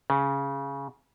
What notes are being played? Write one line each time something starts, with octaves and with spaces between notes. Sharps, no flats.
C#3